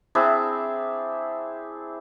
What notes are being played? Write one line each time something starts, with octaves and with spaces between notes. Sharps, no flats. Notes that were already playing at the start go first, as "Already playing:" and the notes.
C4 D4 E4 G#4